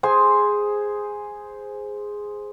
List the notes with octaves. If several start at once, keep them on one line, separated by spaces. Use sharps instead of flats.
G#4 C5 G#5